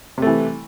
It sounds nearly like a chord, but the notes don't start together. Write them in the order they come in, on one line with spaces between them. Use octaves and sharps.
C3 A3 E3